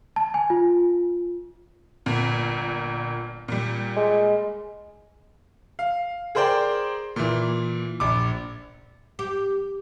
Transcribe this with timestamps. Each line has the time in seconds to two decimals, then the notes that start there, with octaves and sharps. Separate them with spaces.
0.16 A5
0.34 G#5
0.50 F4
2.06 G1 A#2
3.48 A#2 G3
3.96 G#3
5.79 F5
6.35 G#4 A#4 C5 D5 G5
7.16 A#2 E3
8.00 A#1 D6
9.19 G4